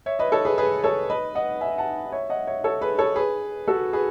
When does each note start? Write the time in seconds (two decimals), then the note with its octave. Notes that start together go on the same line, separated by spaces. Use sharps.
0.06 C#5 E5
0.19 B4 D#5
0.32 A4 C#5
0.45 G#4 B4
0.58 G#4 B4
0.84 A4 C#5
1.10 B4 D#5
1.35 D#5 F#5
1.61 E5 G#5
1.78 F#5 A5
2.12 C#5 E5
2.30 D#5 F#5
2.47 C#5 E5
2.64 A4 C#5
2.81 G#4 B4
2.98 A4 C#5
3.16 G#4 B4
3.68 F#4 A4
3.93 G#4 B4